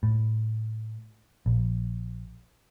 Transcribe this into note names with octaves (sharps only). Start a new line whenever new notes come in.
A2
A#1